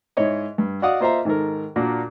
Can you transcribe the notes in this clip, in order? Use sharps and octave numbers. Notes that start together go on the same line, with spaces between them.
G#2 E4 C#5 D#5
G2
F#4 D5 D#5 F5 F#5 D#6
A#3 F4 C5 D#5 E5 A#5
G#2 D#3 A4 A#4
A#2 A#3 D4 F#4